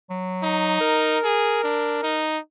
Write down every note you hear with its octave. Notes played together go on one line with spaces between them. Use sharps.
F#3
D#4
A#4
G#4
D4
D#4